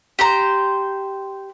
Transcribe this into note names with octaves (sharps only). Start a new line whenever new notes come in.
G4 C5 A#5